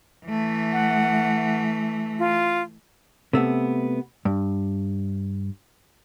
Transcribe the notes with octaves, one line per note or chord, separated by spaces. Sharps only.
E3 A3
F#5
F4
C3 A3 B3
G2